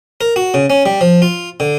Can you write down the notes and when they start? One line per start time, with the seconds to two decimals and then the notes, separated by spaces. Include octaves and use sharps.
0.21 A#4
0.36 F#4
0.54 C#3
0.70 C#4
0.86 G3
1.01 F3
1.22 F4
1.60 D3